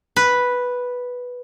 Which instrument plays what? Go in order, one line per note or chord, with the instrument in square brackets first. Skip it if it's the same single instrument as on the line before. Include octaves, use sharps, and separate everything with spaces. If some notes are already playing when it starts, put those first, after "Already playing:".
[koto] B4